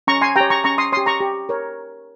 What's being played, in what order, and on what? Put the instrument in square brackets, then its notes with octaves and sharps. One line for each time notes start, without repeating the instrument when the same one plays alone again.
[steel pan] C#4 A#5 C#6
G#5 C6
G4 C#5 G5 A#5
A#5 C#6
C#4 A#5 C#6
C6 D#6
G4 C#5 C6 D#6
A#5 C#6
G4
A#4 C#5